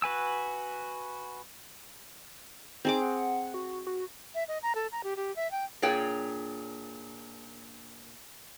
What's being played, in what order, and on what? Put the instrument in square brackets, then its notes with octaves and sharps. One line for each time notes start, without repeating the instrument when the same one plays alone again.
[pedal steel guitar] F#4 B4 G#5 E6
[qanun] C4 G#4 D6 [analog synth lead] D#4
[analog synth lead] F#5
F#4
F#4
[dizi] E5
D#5
A#5
A4
A#5
G4
G4
E5
G5
[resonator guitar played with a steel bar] A#2 D4 G#4 C#5 G5